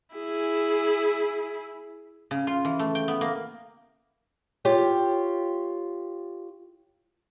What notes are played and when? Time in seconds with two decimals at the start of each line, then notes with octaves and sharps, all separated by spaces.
0.15 E4 G#4
2.31 C#3
2.47 F4
2.65 E3
2.79 A3
2.95 G5
3.08 B3
3.21 A#3
4.65 F4 G4 C#5